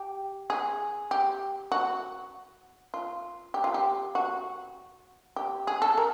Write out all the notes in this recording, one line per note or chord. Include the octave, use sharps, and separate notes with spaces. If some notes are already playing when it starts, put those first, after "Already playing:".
Already playing: G4
G#4
G4
F#4
F4
G4
F4
G4
F#4
G4
G#4
A4
A#4